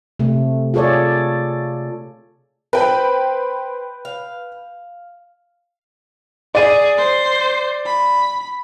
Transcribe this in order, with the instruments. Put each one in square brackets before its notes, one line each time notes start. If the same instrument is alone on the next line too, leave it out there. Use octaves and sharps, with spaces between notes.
[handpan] C3 A3
F4 G#4 A4 C#5 D5
[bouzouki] C4 [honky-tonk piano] B4 G5 B5
[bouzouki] F5
[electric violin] G#4 [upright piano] D5 D#7
[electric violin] C5
B5